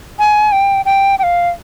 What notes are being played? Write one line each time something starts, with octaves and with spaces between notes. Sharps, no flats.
G#5
G5
G5
G5
F5